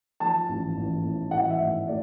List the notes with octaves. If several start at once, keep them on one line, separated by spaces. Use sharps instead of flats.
F3 A5
A1
A1
A2
E3 F#5
E5
A2
A2 D5